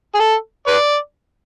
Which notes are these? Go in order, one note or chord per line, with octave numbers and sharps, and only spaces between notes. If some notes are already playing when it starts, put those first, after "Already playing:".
G#4
A4
B4 D5